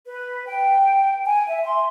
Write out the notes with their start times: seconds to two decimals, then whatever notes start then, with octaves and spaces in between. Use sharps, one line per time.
0.05 B4
0.47 G5
1.25 G#5
1.48 E5
1.64 C6